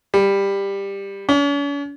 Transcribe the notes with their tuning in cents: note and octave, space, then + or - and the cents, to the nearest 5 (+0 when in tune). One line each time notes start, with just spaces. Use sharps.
G3 +15
C#4 +45